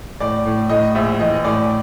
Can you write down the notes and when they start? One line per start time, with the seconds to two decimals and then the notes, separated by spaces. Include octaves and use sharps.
0.20 A2 D5
0.45 A2
0.69 A2 D#5
0.95 A#1 E5
1.20 E3 D#5
1.44 A2 D5